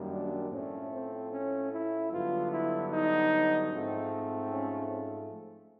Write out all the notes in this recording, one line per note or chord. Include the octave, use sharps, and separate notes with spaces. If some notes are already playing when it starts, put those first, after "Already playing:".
Already playing: F#2 D#3 G3 A#3
D4
A2 F3 A3 C4 C#4
C4
C#4
E4
G2 D3 F#3 B3 F4
E4
D#4
G#2 F3 A3 C4
C#4